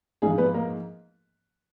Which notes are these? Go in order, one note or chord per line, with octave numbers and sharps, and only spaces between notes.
G#2 F3 G#3 G#4
B3 B4
A#3 A#4